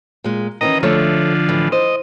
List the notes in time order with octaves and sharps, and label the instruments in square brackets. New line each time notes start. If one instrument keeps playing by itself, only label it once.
[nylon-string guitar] A#2 G#3
[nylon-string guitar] D#3 E3 C#4 [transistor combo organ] D#5 A#5
[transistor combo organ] D3 F3 [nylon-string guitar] A3 C#5 E5
[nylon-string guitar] A2 E3
[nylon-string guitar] C5 [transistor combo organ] D#5